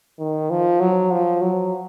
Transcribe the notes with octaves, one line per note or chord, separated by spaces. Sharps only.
D#3
F3
F#3
F3
F#3